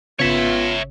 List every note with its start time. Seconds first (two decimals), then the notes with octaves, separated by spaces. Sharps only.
0.20 G#1 C#3 B3 F4 C#5 E5